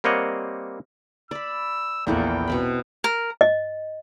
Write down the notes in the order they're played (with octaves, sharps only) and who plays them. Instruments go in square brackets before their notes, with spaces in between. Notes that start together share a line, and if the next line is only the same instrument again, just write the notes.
[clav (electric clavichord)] G3 A#3 C4 C#5 D#5 F#5
[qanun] D5 B5 [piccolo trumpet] E6
[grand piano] A#1 E2 [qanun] A#3 E4 A4 [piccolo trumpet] G5
[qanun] B2 C4 B5
[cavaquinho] A#4
[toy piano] D#5